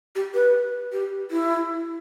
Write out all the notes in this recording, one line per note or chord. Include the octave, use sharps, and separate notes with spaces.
G4
B4
G4
E4